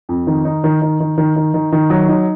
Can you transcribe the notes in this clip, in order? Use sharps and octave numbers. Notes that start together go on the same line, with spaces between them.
F2
D#3
D#4
D#3
D#3
D#3
D#3
D#3
D#3
D#3
F#3
D#4